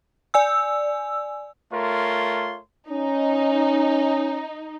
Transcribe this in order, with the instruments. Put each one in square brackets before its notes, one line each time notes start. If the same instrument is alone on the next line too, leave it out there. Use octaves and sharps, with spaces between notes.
[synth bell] D5 G#5 E6
[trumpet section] A3 F4 A#4 C#5 C6
[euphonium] C#4 [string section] D#4